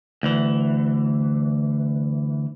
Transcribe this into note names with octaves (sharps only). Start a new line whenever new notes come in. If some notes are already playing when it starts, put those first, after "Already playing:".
D2 E3